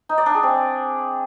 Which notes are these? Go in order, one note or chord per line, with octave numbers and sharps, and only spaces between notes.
D#4
D5
D4
G#4
C4